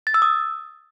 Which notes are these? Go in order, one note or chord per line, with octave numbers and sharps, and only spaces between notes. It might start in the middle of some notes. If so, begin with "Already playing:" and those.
A6
E6
D#6